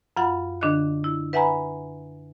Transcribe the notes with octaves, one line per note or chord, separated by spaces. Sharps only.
F#2 F3 F4 F#5 B5
D3 D4 D#5 F#6
E4
B4 E5 F#5 G#5 A#5 B5